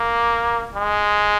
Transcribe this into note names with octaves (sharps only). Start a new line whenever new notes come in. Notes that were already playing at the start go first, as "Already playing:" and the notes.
Already playing: A#3
G#3